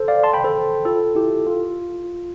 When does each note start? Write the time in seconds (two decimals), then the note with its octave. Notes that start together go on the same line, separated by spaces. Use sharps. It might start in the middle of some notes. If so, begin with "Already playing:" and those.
Already playing: A4 C5
0.08 D5 F5
0.23 A5 C6
0.33 G5 B5
0.44 A4 C5
0.85 F4 A4
1.15 E4 G4
1.47 F4